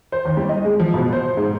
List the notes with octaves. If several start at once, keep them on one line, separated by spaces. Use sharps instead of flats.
C5
D#2
G3
D#5
G#3
F3
B2
C5
G#2